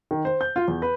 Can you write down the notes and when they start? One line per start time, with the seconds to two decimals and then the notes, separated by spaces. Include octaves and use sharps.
0.11 D#3
0.25 C5
0.41 G6
0.56 F4
0.68 E2
0.82 B4